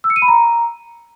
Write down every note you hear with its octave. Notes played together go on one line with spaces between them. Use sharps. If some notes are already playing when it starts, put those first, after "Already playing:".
E6
C#7
D#7
B5
A#5